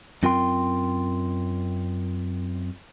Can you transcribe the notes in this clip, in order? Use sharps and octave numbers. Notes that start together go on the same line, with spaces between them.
F#2 C4 F4 A#4 G5 C6